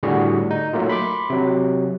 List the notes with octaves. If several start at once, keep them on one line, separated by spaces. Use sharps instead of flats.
A2 D3 G3 F#4 G#4
D#4
F#3 A3 A#3 F4
B5 C6 D6
C3 F#3